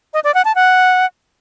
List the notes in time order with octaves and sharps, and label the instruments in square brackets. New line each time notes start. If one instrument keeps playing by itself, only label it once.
[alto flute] D#5
D5
F#5
A5
F#5